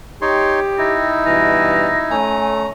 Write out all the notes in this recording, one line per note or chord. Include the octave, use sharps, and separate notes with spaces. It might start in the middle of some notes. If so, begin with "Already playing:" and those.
D#4 G4 C#5 C6
D#4 E4 A#6
G2 B2 E3 A#6
A3 C#4 G#5 A#5